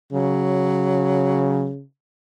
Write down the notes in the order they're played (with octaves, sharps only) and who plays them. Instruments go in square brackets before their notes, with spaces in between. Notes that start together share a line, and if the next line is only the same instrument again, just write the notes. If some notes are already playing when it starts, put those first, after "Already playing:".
[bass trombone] C#3 [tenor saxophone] F#3